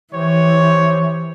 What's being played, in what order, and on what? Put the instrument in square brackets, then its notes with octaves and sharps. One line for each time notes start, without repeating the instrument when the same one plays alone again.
[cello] E3 [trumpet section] G4 C5 C#5